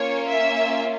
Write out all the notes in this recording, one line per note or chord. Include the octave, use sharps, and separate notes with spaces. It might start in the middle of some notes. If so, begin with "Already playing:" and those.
Already playing: A#3 C#4 F4 C#5
E5